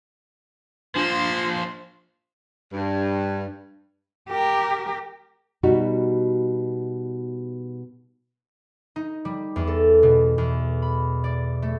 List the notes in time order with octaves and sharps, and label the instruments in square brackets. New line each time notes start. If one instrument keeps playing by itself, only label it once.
[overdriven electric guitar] F3 A#3 [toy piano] D4 [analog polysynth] F4 C6 [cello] C5
[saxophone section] G2
[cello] G4 A#4
[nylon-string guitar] B2 G3 D#4 F#4
[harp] D#4
G3
E2
A4
B2
E2
B5
D5
A3